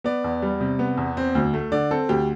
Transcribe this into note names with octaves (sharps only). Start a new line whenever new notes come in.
B3 D5
E2
G3
C3
B3
E2
C4
D2
A3
D3 D5
C4 A4
D2 G4